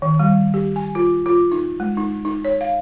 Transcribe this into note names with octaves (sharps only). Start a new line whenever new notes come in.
D#3
G3
G4
G#5
F4
F4
D#4
G#3
D#4
D#4
C#5
F5